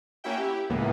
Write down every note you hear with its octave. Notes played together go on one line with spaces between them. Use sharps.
A#3 C#4 E4 F#4 E5 G5
E4 G4
C#2 A2 C#3 E3 A#3 B3